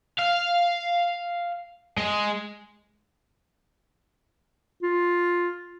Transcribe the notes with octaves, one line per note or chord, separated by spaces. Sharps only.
F5
G#3
F4